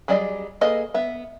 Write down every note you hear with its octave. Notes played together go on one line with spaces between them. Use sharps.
F#3 G3 G#4 D5 D#5
A#3 G#4 A4 B4 D#5
B3 E5